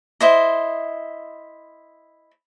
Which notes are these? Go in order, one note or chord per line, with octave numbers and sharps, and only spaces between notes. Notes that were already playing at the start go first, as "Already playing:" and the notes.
E4 C5 D#5